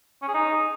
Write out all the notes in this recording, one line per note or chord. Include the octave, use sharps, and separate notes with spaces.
C#4
G#4
D#4